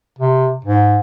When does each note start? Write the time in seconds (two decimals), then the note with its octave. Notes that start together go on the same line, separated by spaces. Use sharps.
0.19 C3
0.65 G#2